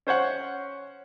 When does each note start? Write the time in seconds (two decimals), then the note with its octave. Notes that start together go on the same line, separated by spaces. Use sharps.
0.07 C#4 C5 C#5 F#5